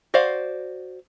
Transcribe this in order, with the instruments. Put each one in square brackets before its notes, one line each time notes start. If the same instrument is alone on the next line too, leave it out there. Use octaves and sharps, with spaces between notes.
[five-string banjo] F#4 C5 D5 F5